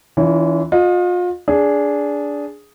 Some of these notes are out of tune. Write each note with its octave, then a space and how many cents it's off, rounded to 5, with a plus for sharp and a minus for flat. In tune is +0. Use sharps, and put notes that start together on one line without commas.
E3 -10 C#4 +40 F4 -30
F4 +35 D#5 -15
D4 -15 G#4 +0